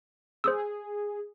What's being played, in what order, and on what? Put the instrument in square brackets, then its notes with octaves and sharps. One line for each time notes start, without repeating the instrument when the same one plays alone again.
[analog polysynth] G#4 [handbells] C5 D#6 E6